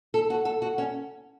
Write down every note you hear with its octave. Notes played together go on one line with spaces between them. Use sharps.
A4
F#4
A4
F#4
C#4